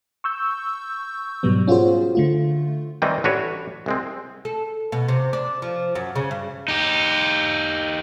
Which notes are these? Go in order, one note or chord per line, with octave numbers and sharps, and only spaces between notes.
C#6 E6 G6
G#2 B2 F#3 G3 B3
C#4 F4 F#4 G#4 C5
D3 A3 F4
D#3 E3 G3 C4 D#4
A1 D4 F#4 B4 C#5
C2 G#3 C4
A4
B2
C3
D4
F3
F#2
C#3
G2
D#4 G4